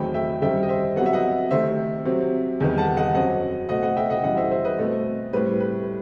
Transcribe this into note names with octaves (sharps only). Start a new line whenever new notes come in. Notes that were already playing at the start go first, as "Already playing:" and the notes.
Already playing: E2 D#3 F#3 A3 C4 G5 B5
E5 G5
F#2 D#3 G3 C4 E5 G5
D#5
C5 E5
C3 F#3 B3 F#5
E5
D#5 F#5
C3 D#3 A3 C4 C5 E5
C3 F#3 C4
E2 D#3 G3 B3
F#5 A5
D#5 F#5
F#2 F#3 C4 D#5 F#5
B2 A3 C4 D#5 F#5
D#5 F#5
E5 G5
D#5 F#5
F#2 E3 G3 D#5 F#5
C5 E5
C5 E5
B4 D#5
B2 A3 C4
A2 G3 C4 B4
B4